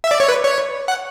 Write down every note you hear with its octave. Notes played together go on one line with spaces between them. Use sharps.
E5
D5
C#5
B4
C#5
F#5